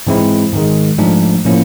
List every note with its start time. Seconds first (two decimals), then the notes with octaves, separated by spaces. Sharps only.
0.07 G#2 E3 G#3 C4 E4
0.53 G#2 D#3 G#3
0.98 G#2 F3 A3 D4
1.45 A2 F3 A#3 C#4 E4